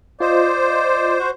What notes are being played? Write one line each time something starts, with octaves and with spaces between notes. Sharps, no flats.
F4 C5 D5 D#5
F#4